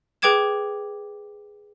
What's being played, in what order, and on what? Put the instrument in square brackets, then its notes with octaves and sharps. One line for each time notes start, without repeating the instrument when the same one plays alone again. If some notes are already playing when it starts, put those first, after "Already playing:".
[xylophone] G#4 B4 G5 D6 G#6 E7